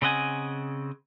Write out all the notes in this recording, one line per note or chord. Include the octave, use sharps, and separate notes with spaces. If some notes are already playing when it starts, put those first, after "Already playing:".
C#3 C4 D#5 F#5 G#5